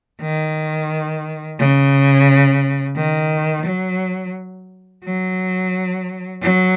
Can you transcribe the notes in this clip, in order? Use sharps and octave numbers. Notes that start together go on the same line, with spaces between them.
D#3
C#3
D#3
F#3
F#3
F#3